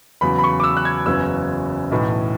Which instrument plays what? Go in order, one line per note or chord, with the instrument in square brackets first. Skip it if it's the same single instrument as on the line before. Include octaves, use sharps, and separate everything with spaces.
[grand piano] E2 C#3 F#3 B5
B5
C#6
D6
E6
F#6
G#6
F#1 E2 C#3 F#3 C#4 E6
B1 A2 E3